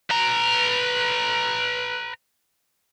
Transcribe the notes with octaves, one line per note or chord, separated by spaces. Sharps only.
B4 A#5